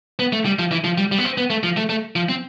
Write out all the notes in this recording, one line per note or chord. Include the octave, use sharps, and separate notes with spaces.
B3
A3
G3
F3
E3
F3
G3
G3
B3
C4
B3
A3
F3
A3
A3
F3
C4